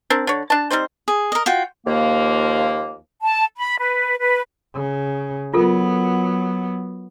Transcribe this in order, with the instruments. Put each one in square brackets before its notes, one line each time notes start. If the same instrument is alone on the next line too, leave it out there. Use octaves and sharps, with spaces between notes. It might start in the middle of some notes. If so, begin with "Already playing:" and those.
[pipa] C4 D4 A#4
D3 C#5
D4 A5
G3 C4 D#4 C5
[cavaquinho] G#4
A#4 D#5
F4 F#4 G5
[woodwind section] D#2 F3 A#3
[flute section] A5
B5
B4
B4
[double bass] C#3
[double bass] F#3 B3 [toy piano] F4 A4 A#4